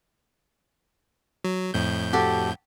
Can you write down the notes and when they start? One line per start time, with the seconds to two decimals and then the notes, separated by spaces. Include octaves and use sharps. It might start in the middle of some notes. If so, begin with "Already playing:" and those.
1.44 F#3
1.74 F2 A2 G6
2.13 F#4 G4 A4